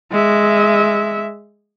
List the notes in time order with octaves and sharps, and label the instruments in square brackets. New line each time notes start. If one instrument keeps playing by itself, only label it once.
[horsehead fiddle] G#3 E5